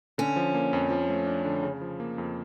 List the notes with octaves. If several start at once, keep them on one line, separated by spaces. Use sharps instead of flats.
D3 C#4
F3
A#3
F2
F3
A3
D4
D3
C#3
F3
A#3
F2